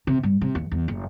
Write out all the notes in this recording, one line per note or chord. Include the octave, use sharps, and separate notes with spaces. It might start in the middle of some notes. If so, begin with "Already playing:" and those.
C3
G2
C3
D#2
E2
F#1